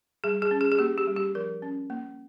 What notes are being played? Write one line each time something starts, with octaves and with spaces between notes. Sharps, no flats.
G3 G#4
G#4
C#4
G#4
G#4
A#3 G4
G4
G3
G4
F3 A#4
C#4
A#3